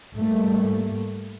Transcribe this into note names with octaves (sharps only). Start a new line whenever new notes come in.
G#2 G3 A3 A#3